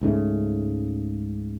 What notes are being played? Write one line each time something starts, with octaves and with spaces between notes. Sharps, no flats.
C#2 G#2 C#3 A3